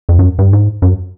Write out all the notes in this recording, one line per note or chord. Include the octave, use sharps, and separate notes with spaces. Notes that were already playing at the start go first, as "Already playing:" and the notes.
F2
F#2
G2
G#2
F#2